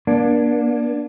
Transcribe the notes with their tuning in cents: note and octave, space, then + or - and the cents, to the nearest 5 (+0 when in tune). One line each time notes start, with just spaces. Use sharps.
A#3 +40 D4 +0